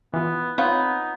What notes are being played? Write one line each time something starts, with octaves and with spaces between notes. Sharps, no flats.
E3 B3 F4
B3 C4 D#4 F4 C#5